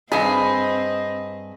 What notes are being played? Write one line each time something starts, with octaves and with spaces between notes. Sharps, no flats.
G2 C4 G#4 D#5 B5